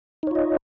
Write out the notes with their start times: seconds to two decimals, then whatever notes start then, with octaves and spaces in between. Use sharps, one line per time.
0.23 D#4
0.27 C#5
0.31 F4
0.35 D#5